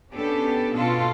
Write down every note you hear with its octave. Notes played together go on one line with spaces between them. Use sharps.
B3 C#4 D4 G4 A4
B2 F4 A4